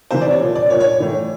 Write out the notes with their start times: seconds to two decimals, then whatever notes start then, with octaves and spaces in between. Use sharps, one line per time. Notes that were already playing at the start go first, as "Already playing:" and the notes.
0.11 C3 E3 C5
0.22 D5
0.30 C#5
0.41 A#2 F3
0.55 D5
0.70 A#2 F3 C#5
0.80 C#5
1.00 A2 E3